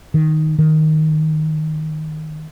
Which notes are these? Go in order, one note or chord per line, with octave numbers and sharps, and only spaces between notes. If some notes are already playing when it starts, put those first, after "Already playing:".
D#3
D#3